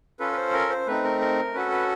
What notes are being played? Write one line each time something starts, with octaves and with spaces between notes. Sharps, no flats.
C#4 F4 A4 B4
B4
C5
A#4
C5
A3 C4 D#4 B4
A#4
A#4
C#4 F#4 A4 B4
B4